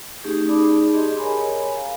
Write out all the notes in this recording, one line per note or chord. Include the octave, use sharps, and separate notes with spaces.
A3 C#4 D#4 G4 G#4
D#4 G#4 D5 A5 B5 D6
G4 G#4 D#5 A5 C6
A#4 C#5 G#5 A#5 B5
F5 A#5